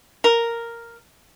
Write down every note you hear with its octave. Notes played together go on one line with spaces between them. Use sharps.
A#4